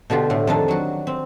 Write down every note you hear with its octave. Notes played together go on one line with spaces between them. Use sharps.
B2 D3 F4 G4
A2
F2 D#3 D4
F#3 F#4
C4